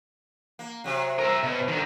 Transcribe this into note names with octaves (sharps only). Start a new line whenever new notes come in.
A#3
C3 F#3
A#4 E5
B2
D3 D#3